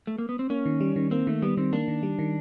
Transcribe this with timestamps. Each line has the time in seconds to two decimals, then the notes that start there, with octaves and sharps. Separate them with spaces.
0.07 A3
0.18 A#3
0.29 B3
0.39 C4
0.50 A#3 C#4
0.66 D#3
0.80 G3
0.96 D#3
1.11 A#3 C4
1.27 D#3 A3
1.42 G3 B3
1.57 D#3 C4
1.73 A#3 D4
1.88 D#3
2.03 G3
2.19 D#3